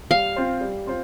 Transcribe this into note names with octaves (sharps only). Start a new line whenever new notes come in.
G3 F5
C4 F4 C5
G3
C4 F4 C5